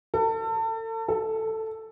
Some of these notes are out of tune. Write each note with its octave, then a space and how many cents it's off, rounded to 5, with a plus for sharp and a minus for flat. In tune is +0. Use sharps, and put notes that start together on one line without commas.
A4 +35
A4 +5